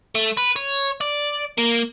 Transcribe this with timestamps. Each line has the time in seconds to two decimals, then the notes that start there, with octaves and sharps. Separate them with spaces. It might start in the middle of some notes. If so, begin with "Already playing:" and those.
0.15 A3
0.37 B4
0.56 C#5
1.01 D5
1.58 A#3